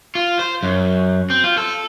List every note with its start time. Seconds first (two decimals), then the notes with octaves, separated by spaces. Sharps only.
0.15 F4
0.39 C5
0.63 F#2
1.30 C4
1.44 F4
1.58 A4